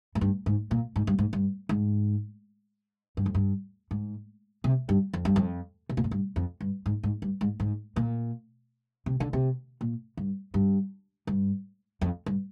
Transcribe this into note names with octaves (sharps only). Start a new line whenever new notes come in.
G#2
G2
G#2
A#2
G#2
G2
G#2
G2
G#2
G2
F2
G2
G#2
C3
G2
F2
G2
F2
C3
A#2
G#2
G2
F2
G2
G#2
G#2
G2
G#2
G#2
A#2
C3
D3
C3
A#2
G2
G2
G2
F2
G2